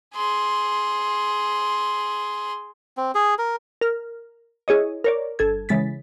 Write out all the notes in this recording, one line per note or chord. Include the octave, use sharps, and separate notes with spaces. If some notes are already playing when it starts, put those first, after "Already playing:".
G#4 C6
C4
G#4
A#4
A#4 F6
E4 G#4 C#5 D#5
A#4 C#5 D5
G1 A4 G#6
C#3 E3 G#3 A6 B6